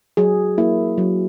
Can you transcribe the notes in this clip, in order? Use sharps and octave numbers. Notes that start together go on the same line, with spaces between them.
F#3 G#4
A#3 E4
F#3